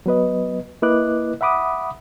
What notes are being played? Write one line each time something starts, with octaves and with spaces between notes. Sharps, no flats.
F#3 B3 B4 D#5
A#3 E4 B4 D#5 D6 F#6
E5 F#5 B5 D6 D#6